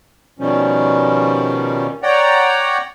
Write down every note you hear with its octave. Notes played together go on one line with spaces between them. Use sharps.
B2 D#3 F3 G3 C#4
C#5 D5 F#5 G5 A#5